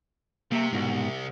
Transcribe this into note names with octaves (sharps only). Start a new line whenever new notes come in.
C3 A#3 E5
C2 G#2 B2 F#4